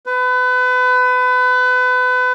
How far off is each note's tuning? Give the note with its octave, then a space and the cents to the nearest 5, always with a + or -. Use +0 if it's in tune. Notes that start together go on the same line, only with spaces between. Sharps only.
B4 +30